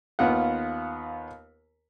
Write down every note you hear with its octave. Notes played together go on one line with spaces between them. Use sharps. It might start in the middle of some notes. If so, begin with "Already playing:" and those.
D#2 B3 F4 F#5